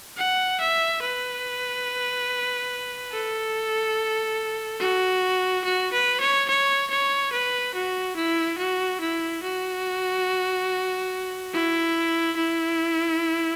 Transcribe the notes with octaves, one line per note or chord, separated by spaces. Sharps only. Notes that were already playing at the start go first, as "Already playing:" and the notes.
F#5
E5
B4
A4
F#4
F#4
B4
C#5
C#5
C#5
B4
F#4
E4
F#4
E4
F#4
E4
E4